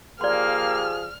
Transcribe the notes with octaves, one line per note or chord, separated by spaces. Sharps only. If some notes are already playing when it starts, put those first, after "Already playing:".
F3 A#3 G4 G#4 D5 C6 F6